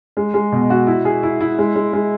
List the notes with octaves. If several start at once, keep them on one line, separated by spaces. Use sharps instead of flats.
G#3
G#3
B2
F#4
E4
G#4
E4
E4
G#3
G#3
G#3